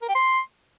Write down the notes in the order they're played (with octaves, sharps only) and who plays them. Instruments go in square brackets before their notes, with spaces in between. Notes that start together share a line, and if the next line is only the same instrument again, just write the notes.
[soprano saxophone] A#4
G5
C6